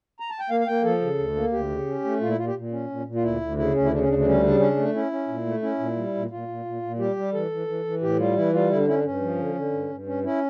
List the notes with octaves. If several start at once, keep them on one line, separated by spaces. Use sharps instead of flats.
A#5
A5
G5
A#3 F5
F5
A#3 G5
F3 A4
C#3
D2
A#3
D2 G4
C#3
C#4
A3
A#2 F4
E4
A#2 F4
G4
A#2
C#4
A#2
A#2
F4
D2 E4
D2
C#3 E4
D2 C#4
E4
C#3 D4
C#4
D2 D4
D4
G3 C#4
C#3 D4
C#4 D4
A3
C#4 E4
C#4
A#2
A3
C#4 E4
A#2
G3
A#2
A#2 F4
A#2
A#2
A#2
G3 G4
G3
E3 A4
E3
E3
E3
A2 G4
G3 F4
E3 E4
G3 F4
D3 E4
D4
C#4 E4
D4
G2 C#4
F3
D3
D3
G2
G2
C#4
C#4 E4